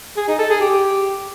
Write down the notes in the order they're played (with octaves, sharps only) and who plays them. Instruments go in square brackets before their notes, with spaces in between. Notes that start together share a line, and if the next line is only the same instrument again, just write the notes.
[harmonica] G#4
D#4
A4
G#4
G4